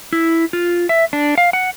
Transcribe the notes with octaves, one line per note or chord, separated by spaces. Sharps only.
E4
F4
E5
D4
F5
F#5